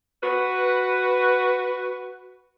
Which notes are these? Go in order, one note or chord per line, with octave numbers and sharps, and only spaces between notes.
F#4 B4